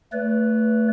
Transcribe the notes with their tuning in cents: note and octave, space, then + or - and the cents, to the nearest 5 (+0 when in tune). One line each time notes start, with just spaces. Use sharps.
A3 +20 B4 +0 D5 -45